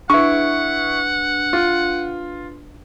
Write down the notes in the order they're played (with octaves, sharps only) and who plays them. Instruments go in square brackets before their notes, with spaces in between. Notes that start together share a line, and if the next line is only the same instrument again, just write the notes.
[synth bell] D4 B4 [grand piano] E4 C#6 [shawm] F#5
[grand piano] F4